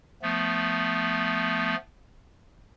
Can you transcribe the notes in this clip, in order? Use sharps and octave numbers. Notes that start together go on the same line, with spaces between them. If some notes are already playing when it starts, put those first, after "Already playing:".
F3 A3 B3